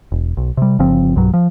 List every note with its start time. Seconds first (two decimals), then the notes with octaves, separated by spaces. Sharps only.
0.12 E1
0.37 B1
0.57 C3 G3
0.79 G1 C#3 F3 C4
1.16 B1 G2 F#3
1.34 F3